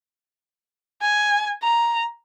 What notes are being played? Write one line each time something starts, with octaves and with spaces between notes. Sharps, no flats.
G#5
A#5